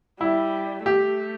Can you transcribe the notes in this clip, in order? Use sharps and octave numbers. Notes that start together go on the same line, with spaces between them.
G3 E4
A3 G4